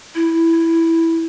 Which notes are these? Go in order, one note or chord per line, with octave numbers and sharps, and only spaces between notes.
E4